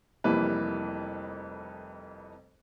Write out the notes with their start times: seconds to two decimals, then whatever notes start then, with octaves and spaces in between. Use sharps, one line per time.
0.24 F1 F2 E3 G3 A#3 B4